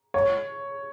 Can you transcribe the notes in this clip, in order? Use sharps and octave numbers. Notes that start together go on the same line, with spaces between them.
C#5